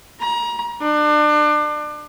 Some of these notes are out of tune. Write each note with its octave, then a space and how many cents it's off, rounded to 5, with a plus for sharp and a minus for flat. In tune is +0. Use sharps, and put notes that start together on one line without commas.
A#5 +30
D4 +30